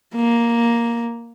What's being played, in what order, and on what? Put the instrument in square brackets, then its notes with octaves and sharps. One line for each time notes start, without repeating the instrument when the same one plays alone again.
[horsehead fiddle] A#3